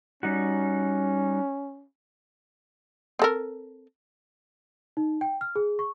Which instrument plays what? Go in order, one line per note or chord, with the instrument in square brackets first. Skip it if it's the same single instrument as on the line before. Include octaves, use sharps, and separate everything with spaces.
[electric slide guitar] G3 D#4 F#4 [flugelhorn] C#4
[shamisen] C4 A4 A#4
[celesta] D#4
G5
F6
G#4
C#6